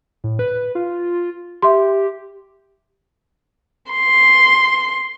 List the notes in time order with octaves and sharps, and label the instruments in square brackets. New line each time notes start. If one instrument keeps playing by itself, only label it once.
[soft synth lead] A2
B4
F4
[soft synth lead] G4 [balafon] E5 C6
[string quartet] C6